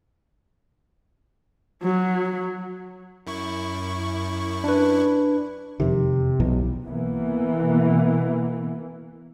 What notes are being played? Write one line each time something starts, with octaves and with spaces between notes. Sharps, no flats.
F#3
F#2 E4 C#6
D4 B4
E1 F2 C3 D#3
B1 B2 E3
B2 E3 A#3 B3